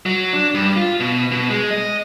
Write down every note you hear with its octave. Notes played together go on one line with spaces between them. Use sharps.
F#3
D4
G2
F4
B2
B2
G#3
D#5